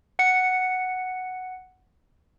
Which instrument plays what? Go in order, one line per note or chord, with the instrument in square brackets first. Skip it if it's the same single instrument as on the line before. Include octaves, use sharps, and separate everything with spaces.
[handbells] F#5 C#7